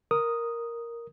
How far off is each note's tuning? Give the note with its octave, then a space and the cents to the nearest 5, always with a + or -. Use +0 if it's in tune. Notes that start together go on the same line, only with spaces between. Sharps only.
A#4 +0 D#6 +0